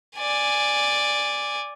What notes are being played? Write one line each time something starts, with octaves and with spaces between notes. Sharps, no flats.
D5 G#5